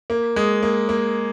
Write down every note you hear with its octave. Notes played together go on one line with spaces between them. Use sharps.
A#3
G#3
A#3
A#3